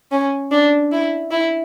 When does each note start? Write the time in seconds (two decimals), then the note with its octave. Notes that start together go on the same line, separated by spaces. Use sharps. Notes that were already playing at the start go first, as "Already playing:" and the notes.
0.11 C#4
0.52 D4
0.92 E4
1.31 E4